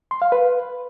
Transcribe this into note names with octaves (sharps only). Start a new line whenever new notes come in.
C6
F5
B4